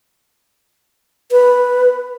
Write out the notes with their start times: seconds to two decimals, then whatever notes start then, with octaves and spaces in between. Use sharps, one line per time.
1.32 B4